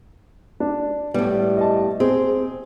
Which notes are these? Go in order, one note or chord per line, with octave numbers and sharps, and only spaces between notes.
D4
A2 G3 B3
D#5 A5
C4 G#4